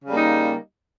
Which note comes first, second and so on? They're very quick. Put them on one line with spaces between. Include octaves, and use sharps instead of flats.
C#3 G3 A#3 D#4